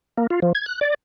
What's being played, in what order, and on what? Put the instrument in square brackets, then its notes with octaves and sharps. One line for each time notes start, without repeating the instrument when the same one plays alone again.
[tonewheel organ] A#3
F4
F3
G#6
F#6
D5